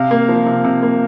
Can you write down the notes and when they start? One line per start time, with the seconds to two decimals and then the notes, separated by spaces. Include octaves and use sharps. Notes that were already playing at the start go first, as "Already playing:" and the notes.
Already playing: C3 F5
0.11 A#3
0.28 F3
0.46 C3
0.65 C3
0.82 A#3